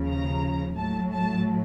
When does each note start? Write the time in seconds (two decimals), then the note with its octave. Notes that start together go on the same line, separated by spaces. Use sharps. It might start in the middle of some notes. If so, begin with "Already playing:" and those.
Already playing: D#2 C#3 F3
0.09 A#5
0.77 A2 F#3 A5
1.12 A5